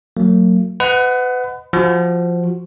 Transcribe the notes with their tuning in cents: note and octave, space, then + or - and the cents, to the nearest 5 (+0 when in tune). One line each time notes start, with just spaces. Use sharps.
F#3 +0 A#3 -45
B4 +30 D#5 +0 F#5 +0
F3 +0 F#4 +0